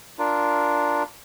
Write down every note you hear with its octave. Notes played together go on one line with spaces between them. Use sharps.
D4 F4 A#4